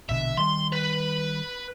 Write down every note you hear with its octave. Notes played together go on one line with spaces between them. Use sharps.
A#1 B2 D3 E5
D#3 G3 C6
B4